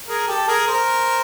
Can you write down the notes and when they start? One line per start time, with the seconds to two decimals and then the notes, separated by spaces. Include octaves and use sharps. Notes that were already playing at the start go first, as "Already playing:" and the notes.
0.08 G#4 A#4
0.28 G4 A4
0.48 G#4 A#4
0.67 A#4 C5